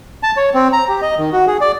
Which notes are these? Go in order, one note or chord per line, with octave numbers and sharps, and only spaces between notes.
A5
C#5
C4
A#5
G4
D#5
D#3
F#4
G#4
D5